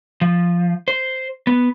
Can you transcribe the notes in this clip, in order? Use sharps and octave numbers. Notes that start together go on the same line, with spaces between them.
F3
C5
B3